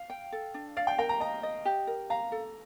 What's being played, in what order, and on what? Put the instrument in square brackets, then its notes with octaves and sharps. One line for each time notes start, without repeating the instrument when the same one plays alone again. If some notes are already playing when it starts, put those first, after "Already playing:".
Already playing: [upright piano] F5
[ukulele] G5
A4
D4
[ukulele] D5 [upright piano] F5
[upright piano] G5
[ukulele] A#4 [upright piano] G5
[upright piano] A#5
[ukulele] D#5 [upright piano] A#5
[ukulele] D#5
G4
A#4
[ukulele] F5 [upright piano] A#5
[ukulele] A4